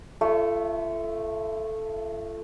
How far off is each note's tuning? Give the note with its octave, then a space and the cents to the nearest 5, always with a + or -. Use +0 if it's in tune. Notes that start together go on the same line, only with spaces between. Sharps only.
A3 +0 F4 -35